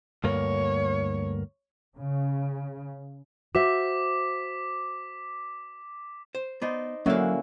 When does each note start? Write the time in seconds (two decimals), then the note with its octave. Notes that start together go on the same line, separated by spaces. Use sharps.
0.24 D2 G2 A#3 C#5
1.96 C#3
3.55 F#4 C5 E5 D6 B6
6.35 C5
6.62 B3 D#4 C5 D5
7.06 D3 F#3 A#3 C#4 E4 F#4 F5